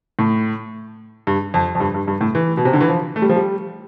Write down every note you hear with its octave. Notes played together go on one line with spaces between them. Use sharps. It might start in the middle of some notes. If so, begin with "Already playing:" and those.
A2
G2
F2
F2
G2
G2
G2
A2
E3
B2
C3
D3
E3
F3
A3
G3
F3
G3